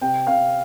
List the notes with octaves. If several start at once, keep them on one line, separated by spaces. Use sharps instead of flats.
C3 G5
C3 F5